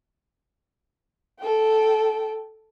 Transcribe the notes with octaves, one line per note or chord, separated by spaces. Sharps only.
A4 G5